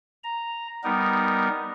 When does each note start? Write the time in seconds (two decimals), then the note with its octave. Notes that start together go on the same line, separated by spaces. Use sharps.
0.24 A#5
0.84 G3 B3 D#4 A#4